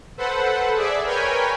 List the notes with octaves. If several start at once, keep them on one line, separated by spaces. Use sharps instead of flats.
A4 B4 C5 F#5
G#4 D5 E5
A#4 B4 C#5 G5 G#5